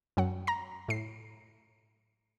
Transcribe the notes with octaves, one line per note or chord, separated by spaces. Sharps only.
F#2 F#3 F#5
A#5 A#6
A2 C7